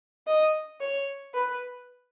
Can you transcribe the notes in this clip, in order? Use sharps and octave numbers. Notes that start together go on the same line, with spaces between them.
D#5
C#5
B4